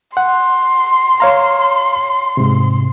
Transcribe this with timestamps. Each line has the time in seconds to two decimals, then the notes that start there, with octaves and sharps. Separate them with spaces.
0.17 F#5 C6
1.20 C#5 F5 A#5
2.37 G#2 C3